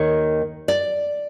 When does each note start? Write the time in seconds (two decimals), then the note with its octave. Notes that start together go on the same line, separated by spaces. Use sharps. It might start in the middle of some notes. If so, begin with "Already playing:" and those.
Already playing: D#2 D#3 C#5
0.68 D5